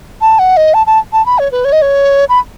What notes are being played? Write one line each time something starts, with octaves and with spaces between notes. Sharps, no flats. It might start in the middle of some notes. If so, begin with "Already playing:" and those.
A5
F#5
D#5
A5
A5
A5
B5
C#5
B4
C#5
D#5
C#5
B5